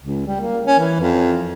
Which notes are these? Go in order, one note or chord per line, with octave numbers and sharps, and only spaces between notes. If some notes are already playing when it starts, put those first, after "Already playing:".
C#2
G3
A#3
C#4
E3
F2